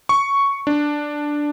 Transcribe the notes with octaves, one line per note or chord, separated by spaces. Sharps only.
C#6
D4